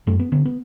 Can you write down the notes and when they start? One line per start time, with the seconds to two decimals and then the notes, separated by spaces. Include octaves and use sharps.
0.07 F#2 A3
0.20 B3
0.32 D3 B3
0.45 B3